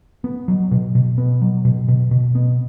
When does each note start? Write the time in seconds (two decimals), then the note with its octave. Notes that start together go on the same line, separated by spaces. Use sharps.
0.24 B3
0.48 F#3
0.71 B2
0.95 B2
1.18 B3
1.42 F#3
1.65 B2
1.88 B2
2.11 B2
2.35 B3